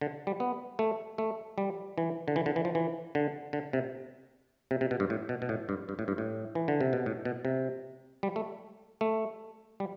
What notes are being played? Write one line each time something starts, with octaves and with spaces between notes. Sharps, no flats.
D3
G3
B3
A3
A3
G3
E3
D3
E3
D3
E3
F3
E3
D3
D3
C3
C3
C3
B2
G2
A2
B2
B2
A2
G2
G2
A2
G2
A2
E3
D3
C3
B2
A2
B2
C3
G3
A3
A3
G3